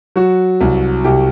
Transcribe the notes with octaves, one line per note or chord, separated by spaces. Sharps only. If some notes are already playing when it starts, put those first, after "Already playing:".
F#3 F#4
C2
C2 G4